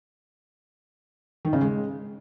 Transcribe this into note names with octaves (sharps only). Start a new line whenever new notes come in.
D#3
C#3
G#3